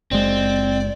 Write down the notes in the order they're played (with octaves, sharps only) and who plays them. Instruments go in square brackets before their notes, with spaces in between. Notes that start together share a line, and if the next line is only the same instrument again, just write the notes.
[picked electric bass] F#1 G#3 [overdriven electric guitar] C4 [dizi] D5